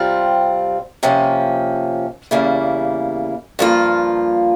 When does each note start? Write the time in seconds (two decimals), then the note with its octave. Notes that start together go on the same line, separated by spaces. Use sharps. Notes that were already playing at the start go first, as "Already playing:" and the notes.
Already playing: C3 G3 C4 F4
1.03 C3 F3 A#3 C#4
2.31 E2 C#3 G3 A#3 E4
3.59 G2 F3 A#3 F4